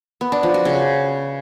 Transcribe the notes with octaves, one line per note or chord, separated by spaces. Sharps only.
B3
D4
F3
F#4
C#3